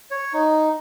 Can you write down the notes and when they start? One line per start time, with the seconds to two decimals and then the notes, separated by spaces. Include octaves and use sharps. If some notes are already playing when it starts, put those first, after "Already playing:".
0.11 C#5
0.33 D#4